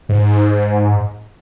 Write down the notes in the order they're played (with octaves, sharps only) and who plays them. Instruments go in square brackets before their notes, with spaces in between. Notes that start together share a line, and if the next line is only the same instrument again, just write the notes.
[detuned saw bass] G#2